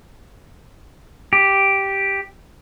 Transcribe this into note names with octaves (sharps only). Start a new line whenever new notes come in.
G4